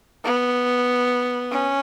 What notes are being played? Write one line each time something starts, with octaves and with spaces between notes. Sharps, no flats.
B3
C#4